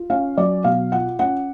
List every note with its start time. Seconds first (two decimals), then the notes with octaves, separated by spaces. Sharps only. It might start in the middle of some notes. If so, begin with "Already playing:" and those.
Already playing: F4
0.10 C#4 F5
0.37 F#3 D5
0.64 B2 F5
0.92 F4 F#5
1.19 C#4 F#5